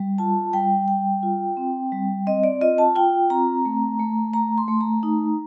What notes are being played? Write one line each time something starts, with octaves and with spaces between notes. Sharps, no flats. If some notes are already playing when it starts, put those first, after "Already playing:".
Already playing: G3
F4 A5
G3 G5
G3 G5
F4
C4
G3
C4 D#5
D5
F4 D#5
A5
F4 G5
C4 A#5
A3
A3
A3 A#5
C6
A3
A#5
D#4